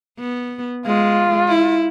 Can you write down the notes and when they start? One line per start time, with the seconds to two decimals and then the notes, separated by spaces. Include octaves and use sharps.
0.19 B3
0.86 G#3 F4
1.49 E4